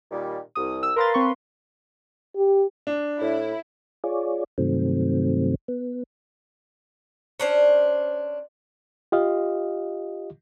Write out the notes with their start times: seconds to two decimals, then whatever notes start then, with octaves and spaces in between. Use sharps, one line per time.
0.11 A#2 D#3 G3
0.55 C2 D#6
0.83 E6
0.96 A#4 B4 F5 A#5 C6 A6
1.14 C4 C#6
2.37 G4
2.87 D4
3.21 A2 E4
4.04 F4 G#4 C#5 D5
4.58 G2 C3 D#3 F#3 A3 C4
5.68 B3
7.40 C#4 D4 C5
9.12 F4 G4 D#5 F5